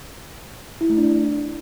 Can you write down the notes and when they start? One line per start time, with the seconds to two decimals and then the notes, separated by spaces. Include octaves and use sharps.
0.81 E4
0.89 A3
0.98 D4